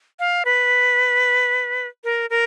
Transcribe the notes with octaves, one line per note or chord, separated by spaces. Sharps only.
F5
B4
A#4
A#4